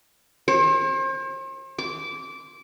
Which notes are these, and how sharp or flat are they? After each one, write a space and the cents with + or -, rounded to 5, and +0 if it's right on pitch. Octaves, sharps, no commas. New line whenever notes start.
C5 +40
D6 -20